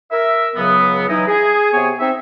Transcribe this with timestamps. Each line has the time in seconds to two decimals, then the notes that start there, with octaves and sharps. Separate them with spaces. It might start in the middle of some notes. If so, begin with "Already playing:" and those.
0.11 A#4 E5
0.56 C#2 C#3 F#3 B3
1.09 E3 F#3 D#4 E4 D#5
1.28 G#4
1.73 C3 B3 G#4 C#5 G#5
2.00 C4 D#4 E5